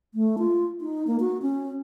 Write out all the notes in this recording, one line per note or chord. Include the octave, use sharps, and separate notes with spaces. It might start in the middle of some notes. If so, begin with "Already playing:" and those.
A3
F4
D#4
A#3
F#4
C#4